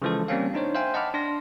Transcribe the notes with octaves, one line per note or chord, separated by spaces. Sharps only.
C#3 E3 F3 G#3 A4
G3 A#3 C4 C#4 F5
D4 D#4 C5 C#5
C5 E5 F5 G5 G#5
D#5 F#5 A5 B5 D6 F6
D4 C6 A#6